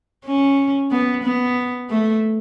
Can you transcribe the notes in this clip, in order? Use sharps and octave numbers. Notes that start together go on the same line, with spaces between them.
C#4
B3
B3
A3